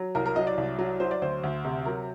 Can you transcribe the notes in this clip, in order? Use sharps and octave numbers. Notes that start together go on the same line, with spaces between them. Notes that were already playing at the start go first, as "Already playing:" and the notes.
Already playing: F#3
C2 A#4
A#4
F#3 D#5
D5
C2
F#3
F#3 C5
D5
D2 C5
D2
C3
F#3 A#4